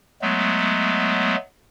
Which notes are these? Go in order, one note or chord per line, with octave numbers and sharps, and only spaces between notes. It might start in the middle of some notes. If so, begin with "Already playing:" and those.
F#3 G#3 A3 B3